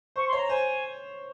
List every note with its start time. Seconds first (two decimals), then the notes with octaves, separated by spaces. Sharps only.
0.16 C5 C#6
0.27 C6
0.33 C#5
0.38 A#5
0.49 C5 G#5